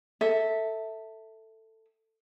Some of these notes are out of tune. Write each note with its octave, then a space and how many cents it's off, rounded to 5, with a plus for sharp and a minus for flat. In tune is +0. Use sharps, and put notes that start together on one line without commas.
A4 +15 E5 -10